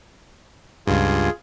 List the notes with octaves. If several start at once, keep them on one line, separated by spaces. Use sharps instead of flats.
C#2 G2 F4 G#4